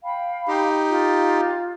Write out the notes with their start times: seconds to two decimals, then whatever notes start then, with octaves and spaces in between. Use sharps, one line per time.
0.04 F5 G5 B5
0.48 D#4 G4
0.90 F4